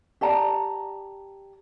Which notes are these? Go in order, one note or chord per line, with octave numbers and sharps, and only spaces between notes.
G4 D5 A5 A#5